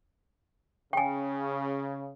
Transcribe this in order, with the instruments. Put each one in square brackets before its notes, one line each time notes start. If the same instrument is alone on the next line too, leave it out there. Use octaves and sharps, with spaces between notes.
[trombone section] C#3 [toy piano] G5 G#5